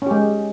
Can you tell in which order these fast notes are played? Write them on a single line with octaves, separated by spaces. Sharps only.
C#4 G4 G#3